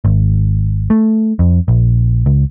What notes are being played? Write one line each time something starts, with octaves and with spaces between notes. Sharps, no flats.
G#1
A3
F2
A#1
C#2